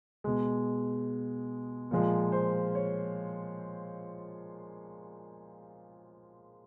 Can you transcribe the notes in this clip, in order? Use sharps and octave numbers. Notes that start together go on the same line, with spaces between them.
B2 G#3
A#2 F3 G#3
C5
C#5